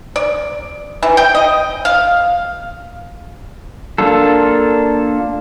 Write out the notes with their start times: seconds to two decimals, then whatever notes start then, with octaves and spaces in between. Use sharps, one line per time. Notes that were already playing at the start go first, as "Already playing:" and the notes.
0.16 D5
1.03 E3
1.17 G5
1.35 D#5
1.85 F5
3.98 A#3 D4 F4 A4